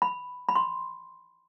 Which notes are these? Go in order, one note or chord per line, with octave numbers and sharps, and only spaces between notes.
B5
B5
C6